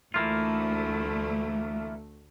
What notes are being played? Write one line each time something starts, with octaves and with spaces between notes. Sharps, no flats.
D2 E3 A3 A#3 F4